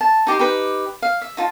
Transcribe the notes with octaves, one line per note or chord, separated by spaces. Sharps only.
A5
D#4 G4 A#5 C6
D#4 G4 B4
F5
E5
D#4 F4 A5